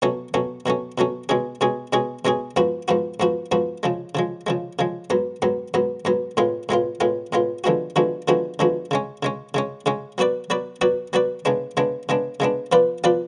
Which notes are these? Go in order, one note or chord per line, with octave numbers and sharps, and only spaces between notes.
B2 F#3 A3 C#4
B2 F#3 A3 C#4
B2 F#3 A3 C#4
B2 F#3 A3 C#4
B2 G#3 C#4 G#4
B2 G#3 C#4 G#4
B2 G#3 C#4 G#4
B2 G#3 C#4 G#4
G#2 F3 B3 F#4
G#2 F3 B3 F#4
G#2 F3 B3 F#4
G#2 F3 B3 F#4
C#3 F3 G#3
C#3 F3 G#3
C#3 F3 G#3
C#3 F3 G#3
G#2 F#3 B3
G#2 F#3 B3
G#2 F#3 B3
G#2 F#3 B3
A2 G#3 B3 F4
A2 G#3 B3 F4
A2 G#3 B3 F4
A2 G#3 B3 F4
D3 F3 G#3 B3 F#4
D3 F3 G#3 B3 F#4
D3 F3 G#3 B3 F#4
D3 F3 G#3 B3 F#4
C#3 G#3 C#4
C#3 G#3 C#4
C#3 G#3 C#4
C#3 G#3 C#4
F#3 B3 F#4 B4 D5
F#3 B3 F#4 B4 D5
F#3 B3 F#4 B4 D5
F#3 B3 F#4 B4 D5
C#3 G#3 B3 D4
C#3 G#3 B3 D4
C#3 G#3 B3 D4
C#3 G#3 B3 D4
F3 B3 F4 B4 D5
F3 B3 F4 B4 D5